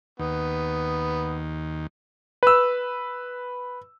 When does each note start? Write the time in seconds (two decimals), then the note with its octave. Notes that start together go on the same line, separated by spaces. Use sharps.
0.19 D#2 B3
2.43 B4 E6